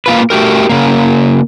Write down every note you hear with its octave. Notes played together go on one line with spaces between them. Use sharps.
A#3 F4 B4
A3 F#4 G4 A#4
C#3 A#3